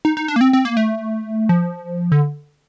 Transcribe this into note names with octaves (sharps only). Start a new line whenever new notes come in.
D#4
D#4
D4
A#3
C4
C4
A#3
A3
F3
D3